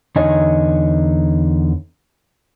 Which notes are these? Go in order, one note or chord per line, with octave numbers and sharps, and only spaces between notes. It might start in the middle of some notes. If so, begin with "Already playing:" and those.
E2 D3 D#4 C#5 D#5 G#5